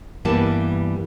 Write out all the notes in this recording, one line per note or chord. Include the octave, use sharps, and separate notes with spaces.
G2 E3 G3 A#3 B3 A5